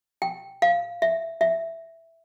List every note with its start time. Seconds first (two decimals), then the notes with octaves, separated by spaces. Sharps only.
0.22 G5
0.62 F5
1.02 E5
1.41 E5